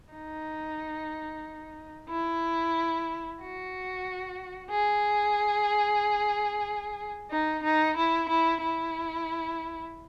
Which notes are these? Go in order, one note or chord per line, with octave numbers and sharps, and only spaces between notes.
D#4
E4
F#4
G#4
D#4
D#4
E4
E4
E4